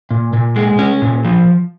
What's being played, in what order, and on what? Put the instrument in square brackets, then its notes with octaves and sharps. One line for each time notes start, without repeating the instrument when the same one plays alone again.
[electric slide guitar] A#2
A#2
G#3
C#4
A#2
F3